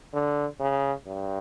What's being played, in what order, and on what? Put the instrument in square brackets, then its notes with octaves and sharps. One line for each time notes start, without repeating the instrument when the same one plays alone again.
[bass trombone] D3
C#3
G2